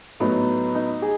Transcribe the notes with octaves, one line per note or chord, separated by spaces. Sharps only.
A2 F#3 B3 D#4
D#4
G#4